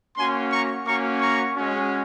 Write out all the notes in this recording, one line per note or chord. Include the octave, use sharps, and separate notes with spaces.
A#3 C#4 F#4 G#5 C6
A#5 C#6
A#3 C#4 F#4 A#5 C#6
A#5 C#6
G#3 C#4 F#4